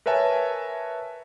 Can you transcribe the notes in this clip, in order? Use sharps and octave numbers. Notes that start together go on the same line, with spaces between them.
A#4 B4 C#5 E5 G#5 A5